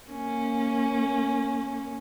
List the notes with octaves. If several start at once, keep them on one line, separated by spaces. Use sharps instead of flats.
A#3 C#4